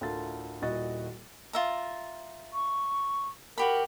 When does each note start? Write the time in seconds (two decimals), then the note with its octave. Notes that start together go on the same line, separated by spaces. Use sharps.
0.01 D2 A2 F4 A#4 A5 A6
0.62 D#1 A#2 E4 F#4 D#5 A6
1.53 F4 E5 A#5
2.54 C#6
3.58 F#4 G4 A#4 B5